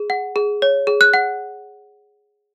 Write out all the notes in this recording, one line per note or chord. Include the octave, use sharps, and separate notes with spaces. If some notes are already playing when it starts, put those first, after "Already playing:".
Already playing: G#4
F#5
G#4
C#5
G#4
F#6
F#5